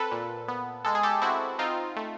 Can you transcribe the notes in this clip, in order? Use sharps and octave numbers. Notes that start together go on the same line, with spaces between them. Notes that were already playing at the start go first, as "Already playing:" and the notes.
Already playing: C4 A4 B4
A#2
B3
G#3 A4
G#4
G4 A4
C4 E4 F#4
C4 D#4 F4
A3